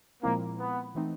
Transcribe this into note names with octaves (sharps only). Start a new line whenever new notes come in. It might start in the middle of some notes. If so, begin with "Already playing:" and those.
A#2 F3 G#3 A#3 C4 E4
B3
E3 A3 C4 D#4